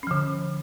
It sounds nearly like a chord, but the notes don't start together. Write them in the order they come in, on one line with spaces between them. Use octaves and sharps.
C#4 F3 D3